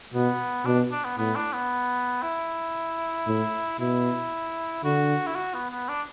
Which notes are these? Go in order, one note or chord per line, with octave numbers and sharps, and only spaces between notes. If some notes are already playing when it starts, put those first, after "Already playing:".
B2 B3
B2 D4
D4
B3
A2 B3
D4
B3
E4
A2
B2 E4
D3 F#4
E4
F#4
B3
B3
D4